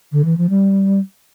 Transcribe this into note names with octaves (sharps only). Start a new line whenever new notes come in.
D3
E3
F3
G3